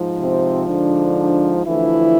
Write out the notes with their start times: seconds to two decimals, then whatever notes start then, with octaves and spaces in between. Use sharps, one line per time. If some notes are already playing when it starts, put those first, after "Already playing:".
Already playing: G#2 F3
0.18 C3 C4
0.67 D3 D4
1.65 D2 D3 E3 F3 E4